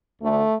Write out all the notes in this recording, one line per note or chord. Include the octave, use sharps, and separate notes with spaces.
D2 D3 A3